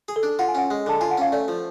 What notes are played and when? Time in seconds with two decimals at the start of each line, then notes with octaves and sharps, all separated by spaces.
0.08 G#4
0.16 A4
0.23 D4
0.39 F4 F#5
0.48 G#5
0.55 C#4 F#5
0.70 G#3
0.86 D3 A5
1.00 F4 G#5
1.11 F#5
1.18 C#4 F5
1.32 A3 D5
1.48 F3